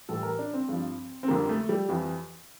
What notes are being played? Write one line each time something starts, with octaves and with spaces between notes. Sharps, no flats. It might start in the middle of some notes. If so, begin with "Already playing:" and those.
A2 E3 G3 A4
A#4
D4
C4
G2 F3
C4
F2 D3 G3 A#3
A3
G3
F2 E3 G3